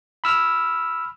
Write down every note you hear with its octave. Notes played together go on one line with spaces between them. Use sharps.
B5 E6 F6